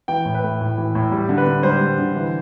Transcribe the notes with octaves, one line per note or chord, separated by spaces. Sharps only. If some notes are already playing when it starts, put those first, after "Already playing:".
E3 G5
A2
B4
A3
A2
E3
A2
G3
D3
B4
D3
G3 C5
G3
D3
E3